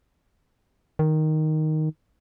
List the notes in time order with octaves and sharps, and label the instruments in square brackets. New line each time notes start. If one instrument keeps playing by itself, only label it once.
[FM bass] D#3